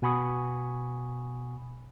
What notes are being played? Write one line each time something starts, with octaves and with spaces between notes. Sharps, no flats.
B2 F#5 G#5 B5 C#6 D#6